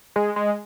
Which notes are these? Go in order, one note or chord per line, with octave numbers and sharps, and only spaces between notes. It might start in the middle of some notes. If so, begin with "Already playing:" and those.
G#3
G#3